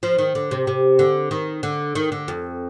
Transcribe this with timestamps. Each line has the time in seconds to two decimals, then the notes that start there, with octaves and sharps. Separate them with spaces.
0.03 F3
0.18 D#3
0.35 D3
0.51 C3
0.67 C3
0.99 D3
1.31 D#3
1.63 D3
1.95 D#3
2.12 D3
2.28 F2